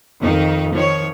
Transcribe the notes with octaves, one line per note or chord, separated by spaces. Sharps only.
F2 D#3 D#4
D#3 F3 C#5